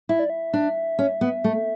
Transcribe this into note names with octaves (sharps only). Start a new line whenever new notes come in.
E4 E5
D5
E5
D4
C#4
B3
A3